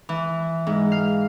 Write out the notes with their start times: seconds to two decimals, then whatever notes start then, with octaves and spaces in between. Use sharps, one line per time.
0.09 E3
0.67 G#2
0.92 F5